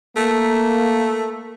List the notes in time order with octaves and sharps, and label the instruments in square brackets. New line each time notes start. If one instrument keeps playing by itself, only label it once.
[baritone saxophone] A3 [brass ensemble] A#3